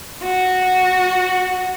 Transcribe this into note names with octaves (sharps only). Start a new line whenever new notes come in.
F#4